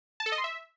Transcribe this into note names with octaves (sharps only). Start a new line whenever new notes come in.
A5
A4
D#5
C6
E5